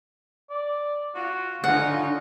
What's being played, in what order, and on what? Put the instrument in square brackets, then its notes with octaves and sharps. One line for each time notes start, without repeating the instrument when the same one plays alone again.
[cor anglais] D5
[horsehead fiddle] F4 [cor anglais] F#4
[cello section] D3 [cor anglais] C#4 [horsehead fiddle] D#4 F4 [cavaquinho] F#5